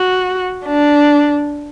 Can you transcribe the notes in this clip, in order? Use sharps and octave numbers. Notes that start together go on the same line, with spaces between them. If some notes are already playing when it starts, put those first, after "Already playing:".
Already playing: F#4
D4